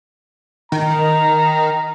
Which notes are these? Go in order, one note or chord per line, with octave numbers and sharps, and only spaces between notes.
D#3 A#5